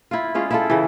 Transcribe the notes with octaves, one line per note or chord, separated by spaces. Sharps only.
E4 F4
G#3 C#4 F4
E4 F4 A4
C#3 E3